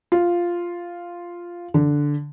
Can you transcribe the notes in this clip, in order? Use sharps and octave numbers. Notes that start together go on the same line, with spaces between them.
F4
D3